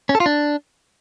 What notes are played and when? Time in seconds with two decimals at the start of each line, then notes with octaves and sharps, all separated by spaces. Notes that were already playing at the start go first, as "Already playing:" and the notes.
0.09 C#4
0.15 A4
0.20 F4
0.26 D4